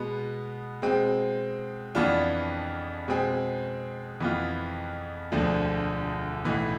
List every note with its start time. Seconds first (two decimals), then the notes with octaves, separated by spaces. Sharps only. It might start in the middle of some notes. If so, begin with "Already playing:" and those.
Already playing: B2 G#3 B3
0.82 B2 G#3 C4
1.95 F2 E3 B3 D4 F4
3.08 B2 G#3 C4 G#4
4.20 F2 E3 B3 F4
5.32 E1 D2 D3 F3
6.44 B1 A2 E3 B3